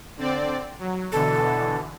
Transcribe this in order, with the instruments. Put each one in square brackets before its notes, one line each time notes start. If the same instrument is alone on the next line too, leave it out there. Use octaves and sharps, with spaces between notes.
[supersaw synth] D3 C4 D5
F#3
[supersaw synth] B2 D3 E3 [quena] A4